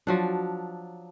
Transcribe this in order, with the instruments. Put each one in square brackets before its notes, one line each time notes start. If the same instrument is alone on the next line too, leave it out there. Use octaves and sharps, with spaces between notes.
[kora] F3 F#3 D4